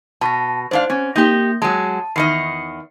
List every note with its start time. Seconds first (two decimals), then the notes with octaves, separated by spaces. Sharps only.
0.21 B2 A5 C#6 A#6
0.71 G#2 D4 C5 F5
0.90 C4 C#4
1.16 A#3 D#4 G4 G6 A#6
1.62 F#3 G#3 A5
2.16 E2 D#3 D#5 C7 C#7